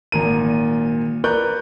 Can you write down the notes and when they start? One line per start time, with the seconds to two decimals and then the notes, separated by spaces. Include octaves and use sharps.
0.12 G#1 A#2 A#4 D#7
1.24 A#4 B4 D5 C#6 F#6 G6